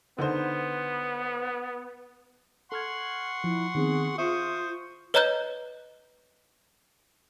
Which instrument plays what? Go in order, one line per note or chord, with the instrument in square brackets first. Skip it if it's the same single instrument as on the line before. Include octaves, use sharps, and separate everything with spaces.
[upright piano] D3 D#4 C5 [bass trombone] B3
[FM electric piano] A4 F6 G#6 [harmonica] F#5 C6 C#6
[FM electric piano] F3 [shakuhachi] E4
[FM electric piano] D#3 B3 C4 [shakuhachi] G#4
[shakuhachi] F4 [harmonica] C5 C#6 D#6 [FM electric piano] E5
[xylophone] B4 C#5 D#5 A#5 F#6 G6